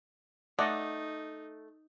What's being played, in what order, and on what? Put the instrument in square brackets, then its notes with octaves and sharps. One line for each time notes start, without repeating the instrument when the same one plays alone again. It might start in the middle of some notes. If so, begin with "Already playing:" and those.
[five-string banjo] A3 [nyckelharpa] D#4 [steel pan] D5 D#5 F#5